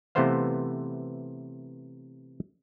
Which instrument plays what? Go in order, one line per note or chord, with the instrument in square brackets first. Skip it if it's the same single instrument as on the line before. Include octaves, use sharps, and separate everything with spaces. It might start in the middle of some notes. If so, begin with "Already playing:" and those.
[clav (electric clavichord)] C3 E3 A3 B3 C5 F5